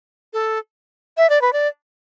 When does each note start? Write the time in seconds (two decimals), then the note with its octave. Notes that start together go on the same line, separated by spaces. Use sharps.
0.33 A4
1.17 E5
1.30 D5
1.41 B4
1.53 D5